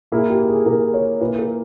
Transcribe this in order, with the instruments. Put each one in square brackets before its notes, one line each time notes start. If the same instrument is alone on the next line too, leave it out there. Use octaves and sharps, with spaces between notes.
[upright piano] A#2 A#3 E4 [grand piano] G#4
[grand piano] G4
G#4
[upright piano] A#2 A#3 E4 [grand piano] A#4
[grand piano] C#5
[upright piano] A#2 A#3 E4 [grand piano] B4
[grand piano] A#4